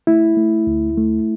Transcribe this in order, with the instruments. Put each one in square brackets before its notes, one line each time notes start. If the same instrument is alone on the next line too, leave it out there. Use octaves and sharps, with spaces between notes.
[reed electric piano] A3 E4
A3
D2
A3